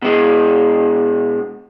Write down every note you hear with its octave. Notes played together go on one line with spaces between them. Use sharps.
B2 G#3